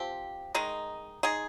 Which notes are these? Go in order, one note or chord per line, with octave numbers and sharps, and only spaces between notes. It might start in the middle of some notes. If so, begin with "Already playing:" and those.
Already playing: F3 C4 G4
D#3 G#3 D#4
G#3 D#4 G#4